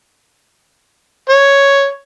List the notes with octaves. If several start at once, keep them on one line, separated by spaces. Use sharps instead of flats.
C#5